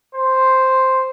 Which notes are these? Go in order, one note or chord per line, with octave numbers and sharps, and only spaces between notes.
C5